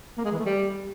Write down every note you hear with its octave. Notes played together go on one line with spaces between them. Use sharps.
A#3
G#3
E3
A3
G3